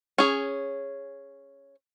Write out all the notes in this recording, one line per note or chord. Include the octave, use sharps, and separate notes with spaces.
C#4 G#4